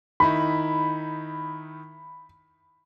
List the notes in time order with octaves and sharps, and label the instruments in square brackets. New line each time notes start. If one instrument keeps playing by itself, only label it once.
[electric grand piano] D#3 D#4 E4 [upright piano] B5